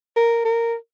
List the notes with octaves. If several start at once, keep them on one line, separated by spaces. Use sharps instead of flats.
A#4
A#4